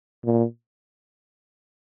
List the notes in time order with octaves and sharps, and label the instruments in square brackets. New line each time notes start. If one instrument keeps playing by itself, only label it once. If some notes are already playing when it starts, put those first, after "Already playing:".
[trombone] A#2